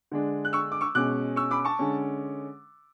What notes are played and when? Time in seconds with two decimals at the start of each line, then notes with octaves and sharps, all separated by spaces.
0.11 D3 G#3 D4
0.45 F#6
0.53 C#6 E6
0.72 D6
0.81 C#6 E6
0.95 B2 G#3 C#4 D6 F#6
1.36 C#6 E6
1.51 B5 D6
1.65 A5 C#6
1.79 D3 G#3 C#4